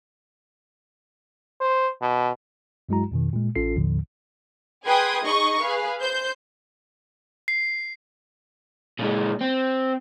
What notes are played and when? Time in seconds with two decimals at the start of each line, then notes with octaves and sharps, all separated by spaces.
1.61 C5
2.02 B2
2.89 G2 F#3 G#3 E4 F#4 A#5
3.12 F2 B2 D#3
3.33 A#2 G#3
3.55 A1 C#4 F4 A4 C7
3.76 D#2 A2 D3 F3
4.85 G#4 B4 G5 C6 D#6 G#6
5.24 D#4 G#4 D#5 C#6
5.61 G#4 B4 F5
6.02 C5 G6
7.48 C7
9.00 A#2 G#3
9.41 C4